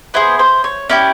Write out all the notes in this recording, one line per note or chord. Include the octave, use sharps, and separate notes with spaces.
B3 E4 G#4 C5
C5
C#5
C#4 E4 G4 D5